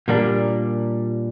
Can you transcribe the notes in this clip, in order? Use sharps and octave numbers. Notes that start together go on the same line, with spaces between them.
A#2 G3 A#3 D4